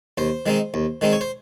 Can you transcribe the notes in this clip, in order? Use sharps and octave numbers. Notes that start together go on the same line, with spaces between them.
D#2 C5
D#3 G#3 C4 D#4
D#2
D#3 G#3 C4 D#4
C#5
C5